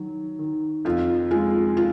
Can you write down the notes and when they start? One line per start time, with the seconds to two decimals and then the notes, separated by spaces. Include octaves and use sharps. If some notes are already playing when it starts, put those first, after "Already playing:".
Already playing: D#3 F#3
0.39 D#3
0.85 F2 F4
1.31 G#3 F4
1.77 F4